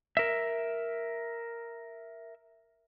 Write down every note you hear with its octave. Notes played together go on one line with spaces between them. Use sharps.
A#4 E5